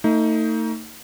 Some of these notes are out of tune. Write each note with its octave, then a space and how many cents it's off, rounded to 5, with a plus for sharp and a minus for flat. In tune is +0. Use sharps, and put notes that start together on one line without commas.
A3 +40 D#4 +20